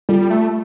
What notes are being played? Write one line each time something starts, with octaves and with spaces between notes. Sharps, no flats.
G3 F4 A4
A3